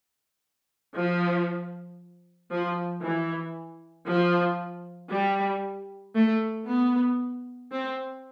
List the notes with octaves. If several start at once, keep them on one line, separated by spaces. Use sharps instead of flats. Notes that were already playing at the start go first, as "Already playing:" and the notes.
F3
F3
E3
F3
G3
A3
B3
C4